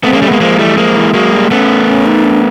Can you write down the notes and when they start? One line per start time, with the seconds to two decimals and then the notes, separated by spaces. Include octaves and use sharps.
0.03 A3 B3 C4
0.13 G#3 A#3 C#4
0.22 G3 A3
0.28 G#3 A#3 B3
0.41 F3 G#3 A#3
0.59 E3 G3 A3
0.77 F3 G#3 A#3
0.96 E3
1.14 F#3 G#3 A#3
1.32 G3
1.51 A3 B3 C#4
1.87 C#4
2.06 D#4
2.24 D4